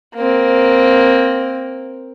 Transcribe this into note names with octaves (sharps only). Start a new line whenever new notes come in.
A#3 C4